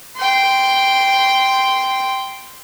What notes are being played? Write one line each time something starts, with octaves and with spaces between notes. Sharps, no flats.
G5 C6